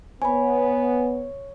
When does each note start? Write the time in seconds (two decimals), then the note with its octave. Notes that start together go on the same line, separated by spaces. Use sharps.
0.22 B3 C#5 G#5 B5